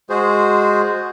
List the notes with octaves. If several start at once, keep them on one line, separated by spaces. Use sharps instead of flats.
G#3 F#4 G#4 C5